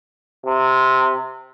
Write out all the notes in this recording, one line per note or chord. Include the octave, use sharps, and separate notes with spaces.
C3